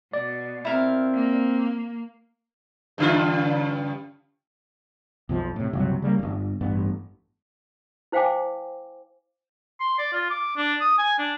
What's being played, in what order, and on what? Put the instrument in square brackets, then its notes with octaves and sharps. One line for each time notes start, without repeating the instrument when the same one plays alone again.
[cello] B2 [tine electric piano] D5
[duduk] C4 [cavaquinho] E4 A#4 F5
[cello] A#3
[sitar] G2 C#3 F4
[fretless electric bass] B1 F2 F3
A2 C3
F#1 C2 C3 F#3
C#3 G3 G#3 A#3
D1 G1
A1 G2 B3
[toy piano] E4 C5 F5 G5 G#5 D6
[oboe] C6
D5
F4
D6
D4
D#6
G#5
D4